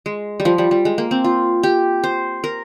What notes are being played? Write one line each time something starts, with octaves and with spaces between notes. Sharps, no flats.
G#3
G3
F3
G3
G3
G#3
A#3
C4
F4
G4
C5
A#4